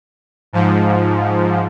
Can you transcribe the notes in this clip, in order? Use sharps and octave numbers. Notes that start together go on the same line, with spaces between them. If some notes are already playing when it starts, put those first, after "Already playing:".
G#2 F3